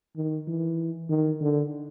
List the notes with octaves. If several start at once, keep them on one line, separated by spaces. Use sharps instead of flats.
D#3
E3
D#3
D3